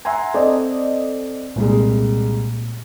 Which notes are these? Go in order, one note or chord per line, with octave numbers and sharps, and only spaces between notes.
E5 F#5 G#5 A#5 C6
C4 A4 D5 D#5
C2 A#2 G3 G#3